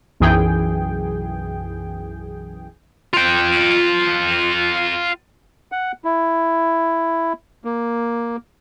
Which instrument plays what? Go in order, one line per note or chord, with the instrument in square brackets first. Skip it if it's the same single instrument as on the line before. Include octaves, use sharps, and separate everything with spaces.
[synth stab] B1 F#2 E3 G#4 G5
[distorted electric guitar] F4 G5
[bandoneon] F#5
E4
A#3